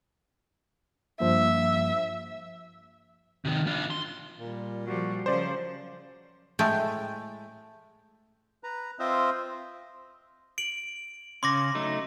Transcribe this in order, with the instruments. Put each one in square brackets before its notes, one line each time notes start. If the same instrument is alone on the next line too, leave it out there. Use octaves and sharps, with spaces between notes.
[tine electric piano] G2 F3 A#3 [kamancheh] E5
[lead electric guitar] C3 D#3
D4 F4
C6
[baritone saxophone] A#2 [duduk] G3
[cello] F3 G3 [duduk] F#4
[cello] C#3 F3 [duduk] F#3 [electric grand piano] C5 D5
[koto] A2 G#3 A3 G5
[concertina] B4 A#5
C4 F4 C5 D#5 E5
[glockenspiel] D7 F#7
[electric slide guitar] C#3 C#4 [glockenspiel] C6 D6 A#6
[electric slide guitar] F#3 A3 D#4